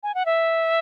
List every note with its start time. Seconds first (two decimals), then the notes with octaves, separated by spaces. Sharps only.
0.03 G#5
0.15 F#5
0.26 E5